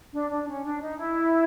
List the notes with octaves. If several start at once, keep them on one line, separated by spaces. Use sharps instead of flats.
D4
D4
C#4
D4
D#4
E4